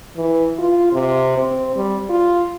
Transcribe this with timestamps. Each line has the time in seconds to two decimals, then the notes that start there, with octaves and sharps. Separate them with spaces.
0.17 E3
0.59 F4
0.93 C3
1.37 C4
1.76 G3
2.09 F4